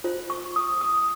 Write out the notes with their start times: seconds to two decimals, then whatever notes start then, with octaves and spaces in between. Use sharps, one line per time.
0.04 F4 C5
0.30 C#6
0.56 D#6
0.81 D#6